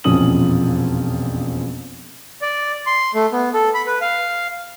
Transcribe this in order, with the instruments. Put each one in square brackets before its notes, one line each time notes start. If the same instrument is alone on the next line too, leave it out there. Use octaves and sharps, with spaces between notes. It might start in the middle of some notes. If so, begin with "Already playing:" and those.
[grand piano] E1 A#1 F2 C#4 D#6 F#7
[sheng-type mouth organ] D5
C6
A3
B3
A4
B5
B4
F5